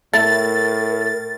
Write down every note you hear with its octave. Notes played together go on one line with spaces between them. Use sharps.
A2 A3 E4 A#4 A6